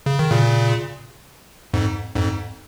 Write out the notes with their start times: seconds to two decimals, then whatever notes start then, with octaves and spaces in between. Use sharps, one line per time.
0.06 C#3
0.19 D#3
0.31 A#2 C#3
1.74 F2 G#2
2.15 F2 G#2